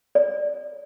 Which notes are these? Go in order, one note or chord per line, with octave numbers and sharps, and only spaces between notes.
D5